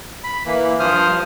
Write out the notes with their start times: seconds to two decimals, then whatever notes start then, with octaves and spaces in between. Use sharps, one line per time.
0.24 B5
0.46 E3 A#3
0.80 G2 F3 C5 D#6 F6